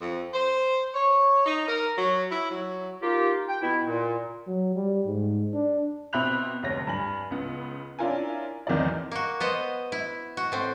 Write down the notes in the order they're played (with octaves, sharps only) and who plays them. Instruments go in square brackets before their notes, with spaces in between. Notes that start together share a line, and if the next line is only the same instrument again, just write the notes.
[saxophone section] F2
C5
C#5
D#4
A#4
F#3
E4
F#3
[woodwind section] A#3 D#4 F4 G4
G5
B2 B3 E4
A#2
[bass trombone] F#3
G3
G#2
D4
[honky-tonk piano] B2 C4 E5 B5 F#6 F7
F1 D2 C#5 A#6
G2 G#5 F#7
C#2 C#3 B3
C#4 D4 E4 F4 A#4 G#5
G#1 E2 D#3 E3 F#3 D5
[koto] A#3 F#4
B3 C5 D#5
E4
F#4
A2 C4